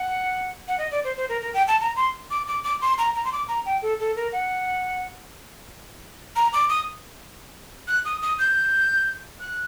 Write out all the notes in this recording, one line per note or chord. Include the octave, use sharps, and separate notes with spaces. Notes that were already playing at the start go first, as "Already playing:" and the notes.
Already playing: F#5
F#5
D#5
D5
C5
C5
A#4
A#4
G5
A5
A#5
C6
D6
D6
D6
C6
A#5
A#5
C6
D6
A#5
G5
A4
A4
A#4
F#5
A#5
D6
D#6
F#6
D#6
D#6
G6
F#6